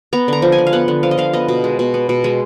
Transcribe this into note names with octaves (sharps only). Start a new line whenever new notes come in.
B3 A#5
D3 A#5
F3
G#5
D3
F5
B3 F#5
D3
F3 F5
D#5
D3 F5
B3 D#5
B2
G#3
B2
B3
B2
G#3